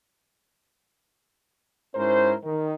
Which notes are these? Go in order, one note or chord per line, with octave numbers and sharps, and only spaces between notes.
G#2 C#4 E4 A#4 C5
D#3